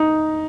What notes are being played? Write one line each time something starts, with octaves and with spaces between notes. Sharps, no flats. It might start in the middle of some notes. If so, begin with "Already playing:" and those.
Already playing: D#4